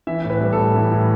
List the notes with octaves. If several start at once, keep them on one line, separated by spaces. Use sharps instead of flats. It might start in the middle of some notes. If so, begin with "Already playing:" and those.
E3 E5
A2
B4
G3
A4
A2
E3
A2